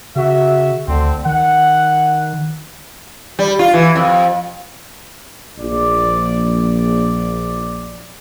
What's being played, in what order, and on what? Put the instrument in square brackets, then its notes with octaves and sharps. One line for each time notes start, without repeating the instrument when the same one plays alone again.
[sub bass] C#3 [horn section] F#4 E5
[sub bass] D2 [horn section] D3 C4
[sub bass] D#3 [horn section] F#5
[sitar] G3
F4
E3
F2
[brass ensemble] A#1 D5